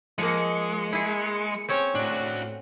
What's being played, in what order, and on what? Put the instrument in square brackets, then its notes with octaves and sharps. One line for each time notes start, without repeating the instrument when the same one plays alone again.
[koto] F3 A#3 [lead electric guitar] G#3 [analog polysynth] C#7
[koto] E4 G#4
C4 C#4 C#5
[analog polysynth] A2 [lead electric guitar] D4 F#4